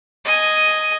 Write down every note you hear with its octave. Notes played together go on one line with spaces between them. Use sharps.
D#5 G#5